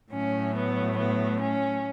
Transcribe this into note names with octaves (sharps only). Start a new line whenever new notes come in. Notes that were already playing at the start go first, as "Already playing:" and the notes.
A2 F#3 A3 C#4
B3
B3
C#4